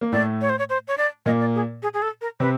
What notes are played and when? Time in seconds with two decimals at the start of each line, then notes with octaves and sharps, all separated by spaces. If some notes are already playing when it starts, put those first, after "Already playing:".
0.01 A#3
0.12 A2 A3 D5
0.41 C#5
0.49 C5
0.59 C#5
0.70 C5
0.88 C#5
0.98 D5
1.26 A#2 A#3 D#5
1.41 D5
1.55 G#4
1.83 G#4
1.94 G#4
2.02 A4
2.21 A#4
2.40 C3 C4 B4